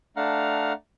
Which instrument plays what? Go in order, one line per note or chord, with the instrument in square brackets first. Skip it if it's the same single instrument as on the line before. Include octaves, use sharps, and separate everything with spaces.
[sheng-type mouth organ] A3 D4 F5 F#5 A#5 F6